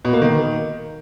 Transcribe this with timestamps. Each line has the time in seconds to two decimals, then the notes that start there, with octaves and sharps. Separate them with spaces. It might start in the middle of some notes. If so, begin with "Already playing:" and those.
0.05 B2
0.13 A#3
0.22 D#3